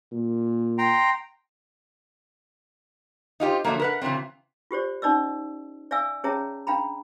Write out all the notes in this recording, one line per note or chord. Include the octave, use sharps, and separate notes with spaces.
A#2
G5 A#5 C6
D#4 F4 G4 C5
D3 F3 F#3 A3 A#3
A#4 B4 F#5
C#3 E3 F#3 B3 C4
F4 G4 C5 D5
C#4 D#4 D5 D#5 E6
D5 E5 F5 G#5 E6
C#4 G#4 C#5 E5 A5 A#5
D4 F5 G5 A#5 B5